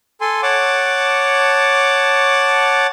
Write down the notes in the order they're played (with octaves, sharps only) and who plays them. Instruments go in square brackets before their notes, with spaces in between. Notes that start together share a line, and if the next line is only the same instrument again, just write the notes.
[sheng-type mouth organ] A4 G#5 C6
C#5 F#5 A5 D6